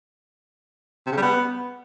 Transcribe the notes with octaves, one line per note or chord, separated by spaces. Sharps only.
C3
C#3
G3
B3